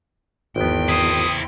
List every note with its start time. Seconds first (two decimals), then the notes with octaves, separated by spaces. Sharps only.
0.56 G#1 E2 B3 G5
0.89 E4 C5 D#6